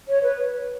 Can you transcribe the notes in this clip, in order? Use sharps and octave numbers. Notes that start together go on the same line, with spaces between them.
C#5
B4